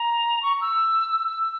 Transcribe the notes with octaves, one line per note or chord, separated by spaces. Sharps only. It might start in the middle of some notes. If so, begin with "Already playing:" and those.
Already playing: A#5
C#6
E6
E6